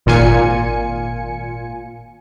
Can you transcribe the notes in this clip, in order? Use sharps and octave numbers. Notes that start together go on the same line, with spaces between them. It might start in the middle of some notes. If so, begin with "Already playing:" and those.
G#1 A#2 F4 G#5 C#7